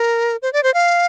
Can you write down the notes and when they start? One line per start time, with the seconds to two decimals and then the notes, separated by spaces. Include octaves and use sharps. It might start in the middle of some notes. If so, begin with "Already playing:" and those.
Already playing: A#4
0.42 C5
0.53 D5
0.63 C5
0.74 F5